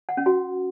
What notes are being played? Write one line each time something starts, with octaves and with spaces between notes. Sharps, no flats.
F#5
C#4
F#4